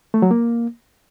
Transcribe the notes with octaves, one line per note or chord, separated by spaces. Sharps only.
A3
F#3
A#3